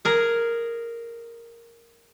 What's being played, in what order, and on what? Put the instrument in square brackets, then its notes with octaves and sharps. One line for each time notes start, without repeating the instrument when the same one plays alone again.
[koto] G#4 A#4